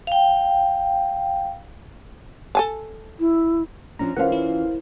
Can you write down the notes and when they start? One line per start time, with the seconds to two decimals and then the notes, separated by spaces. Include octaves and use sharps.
0.07 F5 G5
2.55 A4 G#5 A5
3.20 E4
3.99 F3 C#4 D4 A#5
4.16 E3 C#4 F4 A#4 C5 F5 F#5
4.32 E4